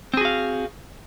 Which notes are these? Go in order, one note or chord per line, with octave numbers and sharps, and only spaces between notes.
C4 F#4 G#4 F5